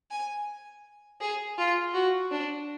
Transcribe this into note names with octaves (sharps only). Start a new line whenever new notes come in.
G#5
G#4
F4
F#4
D4